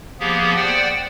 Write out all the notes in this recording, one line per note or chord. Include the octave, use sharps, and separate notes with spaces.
F3 A#3 B3 G4 G#4
C5 D5 F#5 G5